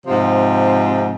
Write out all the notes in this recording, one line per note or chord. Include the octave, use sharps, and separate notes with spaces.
G#2 C3 F3